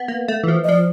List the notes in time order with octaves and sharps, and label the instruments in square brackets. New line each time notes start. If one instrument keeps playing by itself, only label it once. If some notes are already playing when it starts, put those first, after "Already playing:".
Already playing: [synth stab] B3
A#3
A3
E3
F3
[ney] D#5
[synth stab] F3 [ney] D5